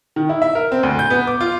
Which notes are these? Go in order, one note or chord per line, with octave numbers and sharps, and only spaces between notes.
D#3
E4
E5
A#4
C4
D2
G6
B3
D6
F4